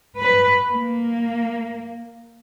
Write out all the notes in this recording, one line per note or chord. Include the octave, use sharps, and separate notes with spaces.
B4
A#3